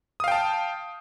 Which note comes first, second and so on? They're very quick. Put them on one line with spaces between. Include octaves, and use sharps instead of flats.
D#6 F5 G5 A5